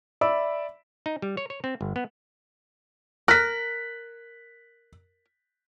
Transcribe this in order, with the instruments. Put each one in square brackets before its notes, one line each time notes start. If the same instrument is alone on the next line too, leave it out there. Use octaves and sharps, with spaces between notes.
[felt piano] D5 E5 B5 E6
[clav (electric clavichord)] D#4
G3
C#5
C#5
C4
G1
B3
[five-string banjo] A#4 [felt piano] F#6 B6